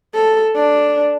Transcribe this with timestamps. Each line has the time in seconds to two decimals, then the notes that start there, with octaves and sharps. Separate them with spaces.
0.15 A4
0.55 D4